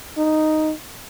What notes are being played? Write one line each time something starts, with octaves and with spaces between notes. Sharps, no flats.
D#4